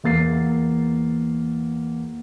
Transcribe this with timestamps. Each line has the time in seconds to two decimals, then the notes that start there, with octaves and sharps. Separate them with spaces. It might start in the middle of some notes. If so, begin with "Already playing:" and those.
0.04 E2 A#3 A6 C7